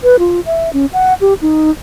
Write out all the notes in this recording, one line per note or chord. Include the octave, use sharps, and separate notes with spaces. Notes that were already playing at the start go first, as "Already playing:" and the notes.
B4
F4
E5
C#4
F#5
G4
D#4